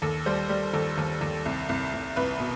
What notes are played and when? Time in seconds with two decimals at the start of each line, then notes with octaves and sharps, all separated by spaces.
0.02 D#2 A4
0.26 G3 C5
0.49 G3
0.74 D#2 A4
0.98 D#2
1.21 D#2
1.45 C2
1.69 C2
1.93 C2
2.16 C2 B4
2.40 B2